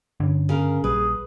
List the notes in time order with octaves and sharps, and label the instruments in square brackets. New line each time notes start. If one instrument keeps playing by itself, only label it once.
[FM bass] G2 [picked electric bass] D3 C#4
[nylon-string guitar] C#3 A#4
[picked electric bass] A#1 [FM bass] G3 [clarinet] G#4 [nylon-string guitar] B4